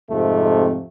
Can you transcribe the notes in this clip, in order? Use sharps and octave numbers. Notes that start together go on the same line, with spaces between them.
F2 G#2 C3 A3